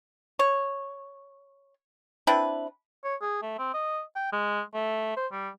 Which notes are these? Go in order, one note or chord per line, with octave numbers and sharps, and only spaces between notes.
C#5
C4 D4 E4 B4
C#5
G#4
A3
C4
D#5
G5
G#3
A3
C5
G3